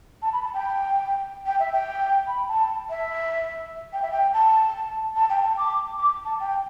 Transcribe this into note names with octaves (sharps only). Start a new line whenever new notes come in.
A5
B5
A5
G5
G5
E5
G5
B5
A5
E5
G5
E5
G5
A5
A5
G5
A5
D6
D6
A5
G5